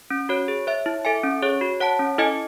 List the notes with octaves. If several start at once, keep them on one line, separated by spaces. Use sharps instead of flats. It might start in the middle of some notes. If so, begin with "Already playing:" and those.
C#4
F#4 C#5
G#4
C#5 E5
E4
A4 E5 G#5
C#4
G#4 C#5
F#4
C#5 F#5 A5
C#4
E4 A4 D#5 G#5